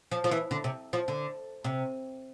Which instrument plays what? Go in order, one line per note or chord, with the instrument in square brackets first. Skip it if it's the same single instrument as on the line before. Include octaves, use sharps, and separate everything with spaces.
[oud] F3
F3
E3
D3
C3
F3
D3
C3